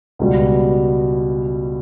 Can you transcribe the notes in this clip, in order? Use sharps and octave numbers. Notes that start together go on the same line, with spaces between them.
C#2 B2 G3